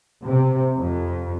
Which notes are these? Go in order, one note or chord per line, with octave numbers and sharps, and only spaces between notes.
C3
F2